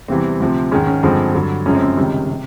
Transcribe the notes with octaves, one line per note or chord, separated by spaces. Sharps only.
E2 C3 E3 G3 C4
D2 C3 F3
G#2 D#3 G#3 C#4
C#4
G2 D3 F3 G#3 C4
G2 D3 F#3
F#2 C#3 F3 G#3 C#4
C4
C#4
C#2 C3 D#3 G3
C3